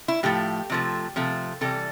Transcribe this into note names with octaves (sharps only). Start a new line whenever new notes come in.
E4
A2 F3 A3 G4
C3 F3 A3
C3 F3 A3
C3 E3 G3 A4